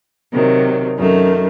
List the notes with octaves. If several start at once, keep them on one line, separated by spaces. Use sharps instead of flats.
C3 D#3 F#3
F#2 D#3 A3